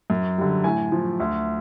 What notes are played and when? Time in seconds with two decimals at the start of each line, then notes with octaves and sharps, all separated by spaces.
0.10 F#2
0.38 D3 G3
0.64 A2 G#5
0.92 F3
1.20 D2